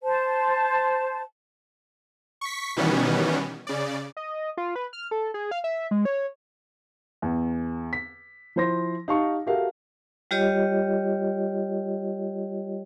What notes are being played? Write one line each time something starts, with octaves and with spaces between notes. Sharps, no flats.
C5 A5
C#6 B6
B2 D#3 E3 G3 B3 C#4
C#3 D5
D#5
F4
B4
F6
A4
G#4
F5
E5
G#3
C#5
E2
B6
F3 E4 C5 C6 A#6
D#4 G4 F5 A5 C#6
F#4 G4 A4 A#4 E5 F5
G3 F4 G4 C#5 D#5